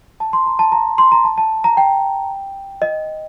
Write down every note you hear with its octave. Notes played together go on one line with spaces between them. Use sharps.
A5
C6
A#5
A5
A#5
C6
A#5
A5
A5
A#5
G5
D#5